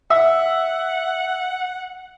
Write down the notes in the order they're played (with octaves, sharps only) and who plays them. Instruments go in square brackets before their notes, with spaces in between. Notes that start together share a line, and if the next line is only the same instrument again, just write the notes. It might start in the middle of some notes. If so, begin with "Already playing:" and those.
[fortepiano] E5 [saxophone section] F#5